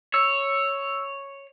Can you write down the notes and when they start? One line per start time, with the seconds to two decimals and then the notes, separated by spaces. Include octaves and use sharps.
0.14 C#5 E6